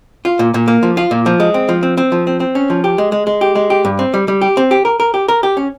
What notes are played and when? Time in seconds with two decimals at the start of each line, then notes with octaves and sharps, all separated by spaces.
0.25 F4
0.39 A#2
0.54 A#2
0.68 A#3
0.83 F3
0.97 F4
1.11 A#2
1.26 F3
1.40 G#3
1.54 C4
1.69 F3
1.83 C4
1.97 C4
2.12 F3
2.27 C4
2.40 C4
2.55 C#4
2.70 F3
2.84 G4
2.98 G#3
3.12 G#3
3.27 G#3
3.41 G4
3.55 G#3
3.70 G4
3.85 G2
3.99 C4
4.14 G3
4.28 G3
4.41 G4
4.57 C4
4.71 G4
4.85 A#4
5.00 A#4
5.14 G4
5.28 A#4
5.43 G4
5.57 C#4